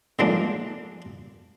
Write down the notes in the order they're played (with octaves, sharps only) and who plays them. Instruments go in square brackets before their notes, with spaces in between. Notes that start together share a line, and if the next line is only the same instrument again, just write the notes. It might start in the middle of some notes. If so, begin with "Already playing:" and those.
[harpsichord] D3 E3 F3 G#3 A#3 D4